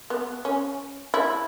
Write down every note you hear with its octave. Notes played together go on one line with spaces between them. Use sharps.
B3
C#4
E4